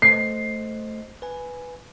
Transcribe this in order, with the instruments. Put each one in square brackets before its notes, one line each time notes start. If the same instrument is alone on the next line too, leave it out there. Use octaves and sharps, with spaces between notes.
[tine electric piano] A3 C5 D#5 [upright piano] C7
[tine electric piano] B4 G#5